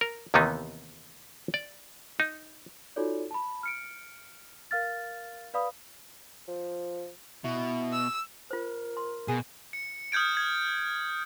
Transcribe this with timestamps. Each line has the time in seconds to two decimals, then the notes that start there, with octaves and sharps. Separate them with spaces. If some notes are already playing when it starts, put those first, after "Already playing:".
0.01 A#4
0.34 D#2 C3 D#3 E3 B3 D#4
1.54 D5
2.20 D#4
2.96 D#4 F4 F#4 A4 C#5 D5
3.31 A5 B5
3.63 F6 C#7 D7
4.71 A#4 F5 F6 A6
5.54 B4 D5 F5 B5 D#6
6.48 F3
7.44 B2 E4
7.93 E6
8.51 F4 A#4 C5
8.97 C6
9.28 B2 G#4
9.73 C#7
10.12 D#6 F6 G6 G#6 D7
10.37 G#6